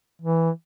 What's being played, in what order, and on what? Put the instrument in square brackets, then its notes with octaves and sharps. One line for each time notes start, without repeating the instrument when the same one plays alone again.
[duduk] E3